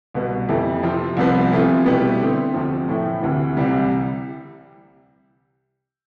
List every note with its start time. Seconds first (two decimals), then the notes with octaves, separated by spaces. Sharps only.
0.14 C2 B2 B3
0.48 F2 E3 A3 E4 G4
0.83 C3 F3 C4
1.17 C2 C3 F3 B3
1.51 C3 E3 A3 C4 F4
1.86 B2 G3 B3 E4 G4
2.20 D3 A3 C4
2.54 D2 C3 F3
2.88 A2 E3 A3 E4
3.22 D2 C3 E3
3.57 C2 C3 E3 G3